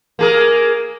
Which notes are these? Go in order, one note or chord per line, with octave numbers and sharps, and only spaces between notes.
A#3 G#4 A#4